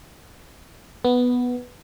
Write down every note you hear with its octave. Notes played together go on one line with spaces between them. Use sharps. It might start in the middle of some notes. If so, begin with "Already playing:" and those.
B3